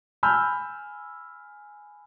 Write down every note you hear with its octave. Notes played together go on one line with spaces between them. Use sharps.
G#5 B5 E6 F6 G6